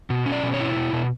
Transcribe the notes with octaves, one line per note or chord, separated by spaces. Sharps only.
B2
C#4
D5
B2
C#5
E4
B2
B2